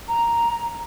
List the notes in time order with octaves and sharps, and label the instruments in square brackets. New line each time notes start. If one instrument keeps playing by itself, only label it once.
[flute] A#5